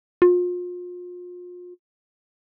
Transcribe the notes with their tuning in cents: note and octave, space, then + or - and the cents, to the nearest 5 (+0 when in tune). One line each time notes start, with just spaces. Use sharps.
F4 +35